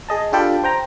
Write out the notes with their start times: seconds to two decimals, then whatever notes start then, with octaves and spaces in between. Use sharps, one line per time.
0.09 G#4 D#5 A5
0.32 D4 F4 G4 A4 G5 B5
0.64 C5 G5 A#5